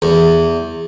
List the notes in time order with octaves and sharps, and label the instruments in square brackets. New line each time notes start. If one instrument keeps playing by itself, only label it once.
[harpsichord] E2